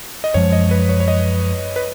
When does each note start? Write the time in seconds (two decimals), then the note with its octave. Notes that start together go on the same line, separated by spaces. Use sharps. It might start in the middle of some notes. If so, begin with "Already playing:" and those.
0.24 D#5
0.34 F#2 F3 G#3 C#5
0.53 D#5
0.71 B4
0.89 C#5
1.00 C#5
1.08 D#5
1.76 B4